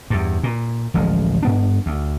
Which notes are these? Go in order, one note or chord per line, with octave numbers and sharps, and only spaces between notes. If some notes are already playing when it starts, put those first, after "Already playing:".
E2 G2
A#2
D1 A1 F3 G#3
G2 B3 D4
D2